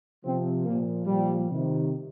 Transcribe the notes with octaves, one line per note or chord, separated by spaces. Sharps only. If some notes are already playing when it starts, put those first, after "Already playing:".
C3 F3 C4
A#2 F3 A#3
A#2 F3 G3
C3 D#3